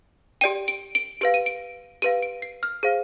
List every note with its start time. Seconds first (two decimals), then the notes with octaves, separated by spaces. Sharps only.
0.41 G4 D5 G5 D#7
0.68 D7
0.95 D7
1.21 G4 B4 F5 D7
1.34 D#7
1.46 D7
2.02 G4 B4 F5 D#7
2.22 D7
2.42 C7
2.63 F6
2.83 G#4 C5 F5